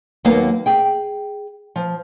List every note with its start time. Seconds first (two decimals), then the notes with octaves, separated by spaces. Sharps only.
0.25 D#2 F#3 A#3 B3 B4 F5
0.66 G#4 G5
1.76 F3